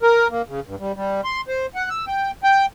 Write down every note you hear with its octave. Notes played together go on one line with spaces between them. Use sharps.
A#4
A#3
C#3
G2
G3
G3
C6
C5
F#5
E6
G5
G5